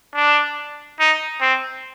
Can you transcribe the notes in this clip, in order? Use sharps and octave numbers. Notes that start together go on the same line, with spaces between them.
D4
D#4
C4